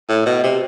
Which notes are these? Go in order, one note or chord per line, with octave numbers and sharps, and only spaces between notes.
A2
B2
C3